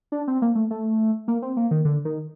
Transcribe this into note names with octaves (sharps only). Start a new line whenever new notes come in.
D4
C4
A#3
A3
A3
A#3
C4
A#3
D#3
D3
D#3